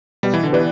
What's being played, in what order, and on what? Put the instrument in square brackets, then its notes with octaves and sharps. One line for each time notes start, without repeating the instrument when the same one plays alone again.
[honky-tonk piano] B2 [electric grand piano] G3
[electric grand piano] E3
D3
[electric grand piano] E3 [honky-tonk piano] B3 G4 B4 D5